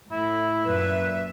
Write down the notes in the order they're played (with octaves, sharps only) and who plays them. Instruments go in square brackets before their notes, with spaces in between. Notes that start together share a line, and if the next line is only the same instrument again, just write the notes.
[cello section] A2 [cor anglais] E4
[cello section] F#2 A#2 E5 [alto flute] B4